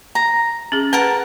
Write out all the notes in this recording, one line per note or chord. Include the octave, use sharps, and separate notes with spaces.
A#5
C#4 G#4
A#4 B4 F#5 A5